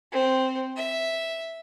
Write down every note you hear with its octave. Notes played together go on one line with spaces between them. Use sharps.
C4
E5